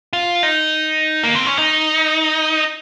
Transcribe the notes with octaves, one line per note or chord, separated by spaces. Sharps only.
F4
D#4
A#3
C4
C#4
D#4